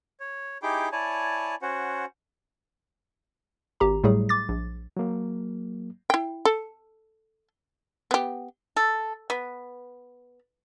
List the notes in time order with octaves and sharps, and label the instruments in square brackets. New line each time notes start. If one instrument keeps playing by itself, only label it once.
[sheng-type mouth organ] C#5
D#4 E4 G4 G#4 G5 D6
E4 C#5 D5 G#5 A5
C#4 F#4 C5 F#5
[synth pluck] G#1 G4 A#5
A2 F#3 G3 A3 G#4
D6 A6
A#1
[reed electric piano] F#3 A#3
[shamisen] E4 G5
A4
B3 G4
[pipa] A4
B3